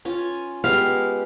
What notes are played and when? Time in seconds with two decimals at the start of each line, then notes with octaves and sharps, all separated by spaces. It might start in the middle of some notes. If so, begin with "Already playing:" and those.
0.05 C#4 F4 G#5
0.64 G#3 B3 G4 F5